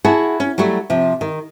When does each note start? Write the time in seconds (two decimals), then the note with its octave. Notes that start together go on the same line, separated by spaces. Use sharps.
0.04 E4 F#4 G#4 F#5 A5
0.40 C#4
0.58 F#3 G3 A3 F#4
0.90 C3 F3
1.21 D#3